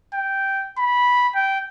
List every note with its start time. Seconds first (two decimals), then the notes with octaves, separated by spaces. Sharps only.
0.14 G5
0.78 B5
1.35 G5